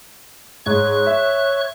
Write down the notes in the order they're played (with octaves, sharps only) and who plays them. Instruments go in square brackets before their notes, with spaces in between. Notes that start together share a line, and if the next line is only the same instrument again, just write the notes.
[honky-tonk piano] G#2 [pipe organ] C#5 C#6 F#6
[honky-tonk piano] E5